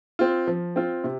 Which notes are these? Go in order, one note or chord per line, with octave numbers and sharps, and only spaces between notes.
C4 F4
F3
C4 F4
C3